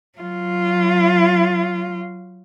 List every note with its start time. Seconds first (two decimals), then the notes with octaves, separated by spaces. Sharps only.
0.19 F#3 F4